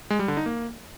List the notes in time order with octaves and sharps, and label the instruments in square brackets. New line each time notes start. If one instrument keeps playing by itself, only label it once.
[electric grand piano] G#3
G3
D3
D#4
A#3